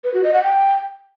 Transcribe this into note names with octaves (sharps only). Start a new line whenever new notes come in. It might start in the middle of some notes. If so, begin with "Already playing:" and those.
B4
F#4
D#5
F#5
G5